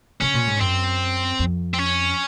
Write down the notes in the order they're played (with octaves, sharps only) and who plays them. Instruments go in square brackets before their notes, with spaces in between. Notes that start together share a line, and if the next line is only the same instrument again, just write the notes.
[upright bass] C#3 [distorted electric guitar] C#4
[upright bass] A#2
G#2
[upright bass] F#2 [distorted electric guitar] C4
[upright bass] F2
[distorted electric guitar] C4
C#4